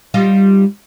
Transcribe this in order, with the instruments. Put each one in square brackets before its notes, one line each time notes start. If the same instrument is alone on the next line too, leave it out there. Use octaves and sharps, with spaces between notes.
[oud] G3 D#4 F4